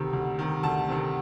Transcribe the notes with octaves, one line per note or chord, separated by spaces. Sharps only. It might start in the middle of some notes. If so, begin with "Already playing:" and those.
Already playing: D2 C3 D#3
D2
C3 D#3
D2 A5
C3 D#3